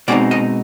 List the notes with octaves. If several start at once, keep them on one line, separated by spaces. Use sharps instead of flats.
B2 G#3 C4 D#4 D5
D#5